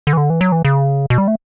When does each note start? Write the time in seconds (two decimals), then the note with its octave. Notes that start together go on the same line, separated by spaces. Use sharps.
0.07 D3
0.13 E3
0.17 D3
0.30 E3
0.41 F#3
0.52 E3
0.65 C#3
1.10 B2
1.18 G3
1.28 A3